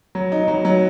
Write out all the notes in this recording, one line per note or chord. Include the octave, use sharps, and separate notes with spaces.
F#3
D#4
F#3
F#3